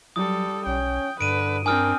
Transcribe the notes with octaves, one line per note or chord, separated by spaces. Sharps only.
F#3 G3 A4 D#6
B1 C#4 G5
G2 D3 B4 D7 D#7
C4 D4 A#4 G#5 D#6 F6